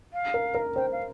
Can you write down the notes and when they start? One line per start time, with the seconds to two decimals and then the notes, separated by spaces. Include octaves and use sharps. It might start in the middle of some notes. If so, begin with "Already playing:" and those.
0.13 F5
0.34 A#4
0.55 A#4
0.75 C5 G5
0.92 F5